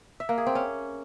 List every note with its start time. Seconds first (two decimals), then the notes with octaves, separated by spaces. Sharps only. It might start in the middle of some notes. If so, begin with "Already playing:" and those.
0.20 E5
0.29 A#3
0.38 G#4
0.46 C4
0.55 C#4